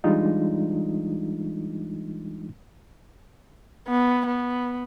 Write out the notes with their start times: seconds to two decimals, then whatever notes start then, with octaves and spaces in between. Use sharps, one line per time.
0.04 E3 G3 G#3 D4 D#4 F4
3.88 B3
4.26 B3